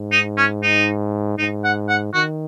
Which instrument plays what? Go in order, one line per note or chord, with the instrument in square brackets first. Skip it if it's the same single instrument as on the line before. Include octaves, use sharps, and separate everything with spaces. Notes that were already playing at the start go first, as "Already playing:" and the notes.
Already playing: [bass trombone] G#2
[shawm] D#4
C#4
D#4
[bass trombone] G#2 [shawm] D#4
[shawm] F#5
F#5
[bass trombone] D#3 [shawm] F#4